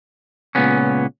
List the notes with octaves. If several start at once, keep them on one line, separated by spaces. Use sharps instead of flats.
C#2 A#2 B3 C#4